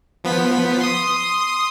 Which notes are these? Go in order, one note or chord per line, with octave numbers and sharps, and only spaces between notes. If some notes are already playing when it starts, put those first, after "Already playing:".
F3 B3 B6
C6 D#6